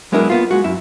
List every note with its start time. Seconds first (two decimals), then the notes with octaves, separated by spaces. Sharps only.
0.12 F#3 G#3 B3 D4 E4 A#4
0.30 A#3 B3 F4
0.51 G#3 F#4
0.64 F#2 E4